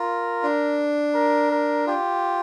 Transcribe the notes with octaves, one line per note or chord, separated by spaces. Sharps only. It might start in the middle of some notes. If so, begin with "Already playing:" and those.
Already playing: F4 A#4
D4
A#4
A#4
F4 G4